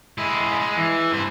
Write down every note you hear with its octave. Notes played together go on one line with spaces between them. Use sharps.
G#3 E4
G#3
E3
G2 C5